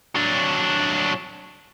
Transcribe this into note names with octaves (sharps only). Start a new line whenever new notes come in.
F#3 D4